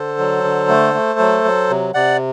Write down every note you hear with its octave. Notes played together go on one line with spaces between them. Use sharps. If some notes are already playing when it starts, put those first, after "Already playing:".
Already playing: D3 A4 C5
F#3
D3
A3
A3
F#3
F#3
C3
C3 D5 F#5